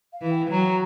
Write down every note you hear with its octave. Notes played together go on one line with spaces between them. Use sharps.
F5
E3
G5
F#3 A#5